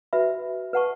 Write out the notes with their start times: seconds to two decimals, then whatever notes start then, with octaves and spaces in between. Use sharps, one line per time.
0.13 F#4 B4 E5 B5
0.73 B4 F#5 A5 C#6